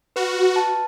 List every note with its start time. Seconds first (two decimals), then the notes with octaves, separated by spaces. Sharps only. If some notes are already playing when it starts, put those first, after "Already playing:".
0.16 F#4 B4
0.56 A5